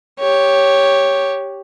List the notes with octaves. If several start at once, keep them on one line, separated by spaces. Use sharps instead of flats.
G4 C#5